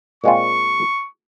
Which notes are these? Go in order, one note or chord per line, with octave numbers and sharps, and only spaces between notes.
A#2 G#3 C4 F4 C#6